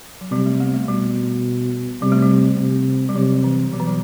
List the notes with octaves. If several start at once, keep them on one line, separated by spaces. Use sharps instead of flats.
F#3
C3 G3
A3
B3
A3
B2 G3
C3 G3
A3
G3
C3
G3
C3 F#3
E3
B2 F#3
E3
F#3